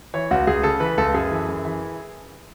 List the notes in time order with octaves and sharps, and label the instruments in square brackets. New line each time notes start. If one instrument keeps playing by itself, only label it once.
[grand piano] E3 C#5
C#2 F#4
C#2 G#4
C#3 A4
E3 B4
C#2 A4
F#2 G#4
E3
F#2
E3